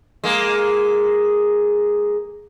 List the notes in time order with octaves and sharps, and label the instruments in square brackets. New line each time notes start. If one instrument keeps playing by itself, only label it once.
[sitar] G#3 A#3